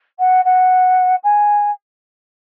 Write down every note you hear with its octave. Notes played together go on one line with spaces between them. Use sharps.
F#5
F#5
G#5